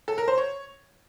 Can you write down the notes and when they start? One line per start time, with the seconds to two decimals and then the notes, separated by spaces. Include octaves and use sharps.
0.08 A4
0.18 A#4
0.28 C5
0.38 C#5